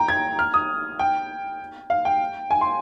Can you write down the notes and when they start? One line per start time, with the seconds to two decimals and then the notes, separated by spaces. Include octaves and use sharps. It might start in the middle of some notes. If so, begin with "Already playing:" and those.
Already playing: G5 A#5
0.08 G#6
0.39 F6
0.54 D#6
0.99 G5
1.90 F5
2.05 G5
2.51 G#5
2.61 C6